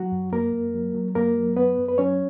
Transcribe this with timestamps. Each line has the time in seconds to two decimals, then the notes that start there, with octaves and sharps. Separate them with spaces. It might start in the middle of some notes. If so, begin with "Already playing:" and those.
Already playing: F#3 F#4
0.12 F#2
0.33 F#2 A#3 A#4
0.53 F#2
0.74 F#3
0.95 F#3
1.15 F#2 A#3 A#4
1.37 F#3
1.57 F#2 B3 B4
1.78 F#2
1.88 B4
1.98 F#3 C#4 C#5